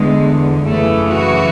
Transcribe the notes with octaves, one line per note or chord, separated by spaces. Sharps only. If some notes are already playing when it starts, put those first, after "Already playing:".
Already playing: E2 D3 G#3
F#2 C#3 E3 A3
F#4